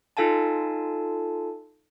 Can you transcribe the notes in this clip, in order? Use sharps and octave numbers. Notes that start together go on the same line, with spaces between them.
D#4 F4 A4 F5 G#5 A5